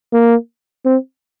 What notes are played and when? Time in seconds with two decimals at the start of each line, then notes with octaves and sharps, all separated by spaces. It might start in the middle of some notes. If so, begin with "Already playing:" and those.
0.13 A#3
0.86 C4